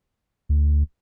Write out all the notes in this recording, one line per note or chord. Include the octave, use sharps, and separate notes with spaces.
D2